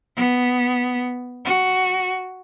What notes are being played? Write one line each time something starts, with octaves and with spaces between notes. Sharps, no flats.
B3
F#4